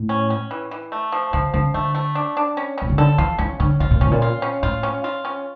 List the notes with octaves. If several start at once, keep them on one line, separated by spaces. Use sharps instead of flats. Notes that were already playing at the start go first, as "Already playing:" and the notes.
Already playing: A2
C#4
C#4
E3
E3
A3
F3
C#3 F3
C#3 F3
D3 A3
A3
D4
D4
C#4
A#2 C#4
C#3
D3 A4
E3 F4
E3 C#4
D3 C#4
C#3 F4
A#2
C#3 C#4
A2
A#2
F4
C#4
A2 F4
C#4
F4
C#4